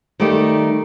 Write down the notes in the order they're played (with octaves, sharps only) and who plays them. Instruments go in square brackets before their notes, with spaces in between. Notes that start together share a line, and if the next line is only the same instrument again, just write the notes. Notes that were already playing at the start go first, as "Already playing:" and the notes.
[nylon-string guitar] D#3 G3 A3 D#4 G4